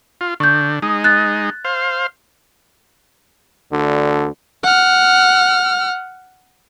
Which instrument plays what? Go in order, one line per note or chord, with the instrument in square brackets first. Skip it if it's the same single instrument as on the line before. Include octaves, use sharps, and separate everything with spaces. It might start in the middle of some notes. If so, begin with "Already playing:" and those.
[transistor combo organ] F4
[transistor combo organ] D3 [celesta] C#6 G6
[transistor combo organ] G#3 D#4 [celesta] D#6
[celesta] F#6 A6
[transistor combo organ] C5 F5
[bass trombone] D2 [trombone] D3
[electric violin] F#5 F6